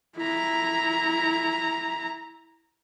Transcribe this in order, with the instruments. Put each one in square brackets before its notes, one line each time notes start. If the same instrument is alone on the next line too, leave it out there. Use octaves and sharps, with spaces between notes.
[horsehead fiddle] E4 A#5